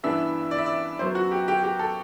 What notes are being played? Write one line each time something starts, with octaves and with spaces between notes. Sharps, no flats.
G2 E3 B3 D4 E5
D5
E5
D5
F#2 F#3 B3 C5
F#4
G4
G4
G4
A4